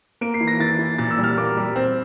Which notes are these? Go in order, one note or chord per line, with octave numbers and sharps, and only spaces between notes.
A#3 D7
C7
E3
A#6
E3 A6
E3
A#2 A6
E6
G3
F6
A#3 D6
G3
C4